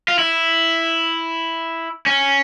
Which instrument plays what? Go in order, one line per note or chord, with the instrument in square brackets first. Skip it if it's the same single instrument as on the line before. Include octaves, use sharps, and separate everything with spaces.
[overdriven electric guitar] F4
E4
C#4